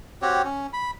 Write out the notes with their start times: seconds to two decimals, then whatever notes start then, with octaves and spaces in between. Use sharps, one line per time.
0.22 C4 F#4 G4 C#5
0.44 C#4
0.73 B5